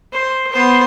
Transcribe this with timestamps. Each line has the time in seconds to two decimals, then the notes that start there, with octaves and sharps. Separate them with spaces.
0.13 C5
0.53 B3 C5